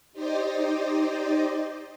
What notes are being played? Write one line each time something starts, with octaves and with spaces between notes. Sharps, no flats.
D#4 G4 C5 D5 D#5